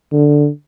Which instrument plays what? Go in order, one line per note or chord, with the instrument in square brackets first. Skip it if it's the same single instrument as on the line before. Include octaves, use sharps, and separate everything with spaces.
[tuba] D3